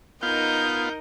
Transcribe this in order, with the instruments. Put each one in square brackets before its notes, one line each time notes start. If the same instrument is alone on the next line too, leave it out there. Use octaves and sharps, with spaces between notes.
[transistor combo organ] B3 F4 F5 [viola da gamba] D#4 A#4 D#5 [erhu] G6